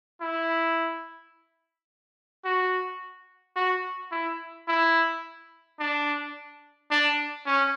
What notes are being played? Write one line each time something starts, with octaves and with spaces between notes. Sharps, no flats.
E4
F#4
F#4
E4
E4
D4
D4
C#4